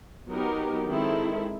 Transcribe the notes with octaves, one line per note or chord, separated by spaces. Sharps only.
F#3 B3 D#4 G4 A#4
D#3 G#3 C4 E4 A4